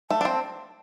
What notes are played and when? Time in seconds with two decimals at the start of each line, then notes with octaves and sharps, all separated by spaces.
0.10 A3 A5
0.21 D4
0.25 C4